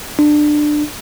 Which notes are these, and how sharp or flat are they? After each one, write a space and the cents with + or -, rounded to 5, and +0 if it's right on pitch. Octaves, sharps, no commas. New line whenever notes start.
D4 +20